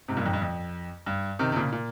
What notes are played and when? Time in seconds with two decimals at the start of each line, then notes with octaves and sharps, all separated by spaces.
0.08 G#2 C3
0.17 G2 A#2
0.25 F2 G#2
0.33 G2
0.42 F2
1.06 G2
1.39 C3 D#3
1.52 C3
1.56 A#2 C#3
1.72 A#2